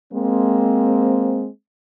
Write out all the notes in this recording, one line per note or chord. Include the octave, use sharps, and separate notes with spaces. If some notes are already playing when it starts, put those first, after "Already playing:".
G#3 A#3 C4